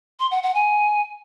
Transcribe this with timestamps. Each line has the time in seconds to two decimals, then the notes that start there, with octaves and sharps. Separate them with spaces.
0.20 C6
0.31 F#5
0.43 F#5
0.54 G#5